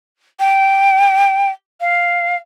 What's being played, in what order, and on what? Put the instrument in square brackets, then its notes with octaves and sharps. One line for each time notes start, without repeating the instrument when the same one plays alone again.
[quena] G5
F5